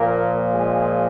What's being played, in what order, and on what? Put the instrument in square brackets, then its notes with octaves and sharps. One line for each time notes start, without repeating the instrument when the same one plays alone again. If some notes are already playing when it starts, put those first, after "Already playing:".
Already playing: [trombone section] A#2 F3 A#3 A#4
G#3 G#4